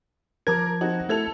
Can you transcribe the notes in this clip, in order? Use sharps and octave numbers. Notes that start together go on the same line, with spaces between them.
F3 A#4 A5 D6 G#6
C4 D#4 F#4
A3 E4 A4 G#6 F7